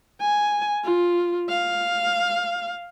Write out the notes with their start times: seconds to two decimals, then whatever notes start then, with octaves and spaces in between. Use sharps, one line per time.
0.21 G#5
0.84 F4
1.49 F5